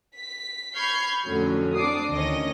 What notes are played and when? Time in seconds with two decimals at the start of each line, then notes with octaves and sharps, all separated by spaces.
0.16 B6
0.75 B5 C#6 F6 G6 G#6 C7
1.26 F2 A2 D3 F#3 C#4
1.75 C4 D4 D6 D#6 C7
2.10 D2 D#3 C#4 C#5 D#5 A#6